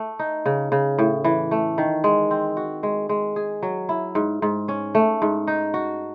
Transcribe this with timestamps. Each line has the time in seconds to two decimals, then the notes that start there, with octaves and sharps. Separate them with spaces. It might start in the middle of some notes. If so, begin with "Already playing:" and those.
Already playing: A3
0.19 D#4
0.46 C#3
0.72 C#3
0.99 A2
1.24 E3
1.51 A3
1.78 D#3
2.04 G#3
2.31 C4
2.57 F#4
2.83 G#3
3.09 G#3
3.36 G#4
3.63 F#3
3.89 E4
4.15 G#2
4.42 G#2
4.68 C#4
4.95 A3
5.22 G#2
5.47 D#4
5.74 F#4